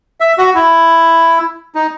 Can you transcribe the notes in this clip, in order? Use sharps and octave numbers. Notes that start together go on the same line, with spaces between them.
E5
F#4
E4
D#4